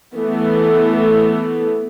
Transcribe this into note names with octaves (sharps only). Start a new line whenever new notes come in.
E3 A3 B3